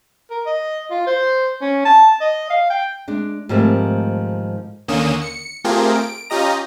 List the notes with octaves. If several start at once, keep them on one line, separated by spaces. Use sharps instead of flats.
A#4
D#5
F4
C5
C#4
A5
D#5
F5
G5
G#3 D4
G#2 D#3 F3 G3 A3 C4
D#2 D3 A#3 C#4 D#6 E7
C#7
A3 C4 F4 G4 G#4 A#4
D7
C#4 F4 G4 D#5 A#5